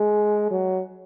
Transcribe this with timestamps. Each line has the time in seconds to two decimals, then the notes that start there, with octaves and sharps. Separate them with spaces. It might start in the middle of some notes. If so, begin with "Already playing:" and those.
Already playing: G#3
0.51 F#3